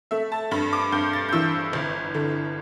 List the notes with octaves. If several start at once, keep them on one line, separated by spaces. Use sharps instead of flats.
A3 E5
A5
G2 B5
D6
G2 G6
A6
G6
E3 E6
G1
D3